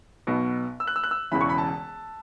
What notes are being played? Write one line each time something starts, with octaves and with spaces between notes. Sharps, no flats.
B1 B2 B3
E6
F#6
E6
F#6
E6
E1 E2 C#3 E3 B5
C#6
B5
A5